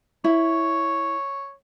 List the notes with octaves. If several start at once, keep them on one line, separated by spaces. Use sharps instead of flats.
E4 C#5